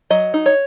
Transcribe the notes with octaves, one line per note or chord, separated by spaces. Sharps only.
F#3 D#5
D#4
C#5